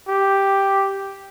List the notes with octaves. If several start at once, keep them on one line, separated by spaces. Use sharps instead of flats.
G4